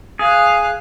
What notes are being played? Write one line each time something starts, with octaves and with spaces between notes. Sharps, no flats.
G#4 F5 F#6